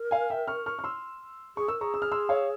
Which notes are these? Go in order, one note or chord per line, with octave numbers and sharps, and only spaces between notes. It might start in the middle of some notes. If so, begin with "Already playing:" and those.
Already playing: A#4
F5 G#5
E5 G5
C#6 F6
C#6 F6
F6
C6 E6
G#4 C#6
A#4 E6
G#4 A#5 C#6
E6
F6
C6 E6
C#5 F5